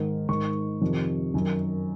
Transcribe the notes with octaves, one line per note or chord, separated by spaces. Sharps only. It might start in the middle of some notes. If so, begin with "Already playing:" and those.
Already playing: G#2 D#3
G#2 D#3 C#6
F2 C3 D#3
F#2 D#3